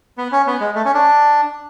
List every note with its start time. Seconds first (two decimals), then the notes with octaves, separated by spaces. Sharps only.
0.18 B3
0.32 C#4
0.47 B3
0.61 G#3
0.75 A3
0.85 C#4
0.94 D4